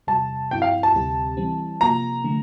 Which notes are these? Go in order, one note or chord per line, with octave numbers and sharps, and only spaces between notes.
E2 C3 G3 A5
G2 F3 C4 E4 G5
F5
A5
D2 C3 G3 C4 G4
E3 G3 C4
C3 F3 A#3 F4 A#5
D3 F3 A3